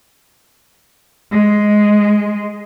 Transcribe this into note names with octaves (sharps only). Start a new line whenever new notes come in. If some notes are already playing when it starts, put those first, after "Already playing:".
G#3